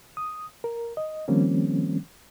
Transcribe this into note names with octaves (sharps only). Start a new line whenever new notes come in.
D#6
A#4
D#5
D#3 F3 G3 A#3 C4 C#4